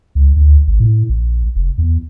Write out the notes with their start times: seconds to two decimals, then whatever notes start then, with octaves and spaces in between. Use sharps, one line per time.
0.15 C#2
0.36 D2
0.67 G#1
0.80 A2
1.09 A#1
1.56 F1
1.78 E2